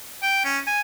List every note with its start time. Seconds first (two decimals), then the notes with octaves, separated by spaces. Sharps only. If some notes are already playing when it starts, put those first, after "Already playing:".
0.23 G5
0.45 C#4
0.67 G#5